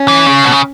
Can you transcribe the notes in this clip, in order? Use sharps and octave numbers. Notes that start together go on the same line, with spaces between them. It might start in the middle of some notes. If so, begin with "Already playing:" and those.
Already playing: C#4
E3
C#3
B2
C#3